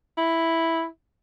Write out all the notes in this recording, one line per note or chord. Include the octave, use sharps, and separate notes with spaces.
E4